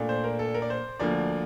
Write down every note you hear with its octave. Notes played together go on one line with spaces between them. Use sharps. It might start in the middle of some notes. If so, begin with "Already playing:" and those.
Already playing: A#2 A3 D4
C5
A#4
A4
A#4
D5
C5
D2 D3 F3 A#3 D5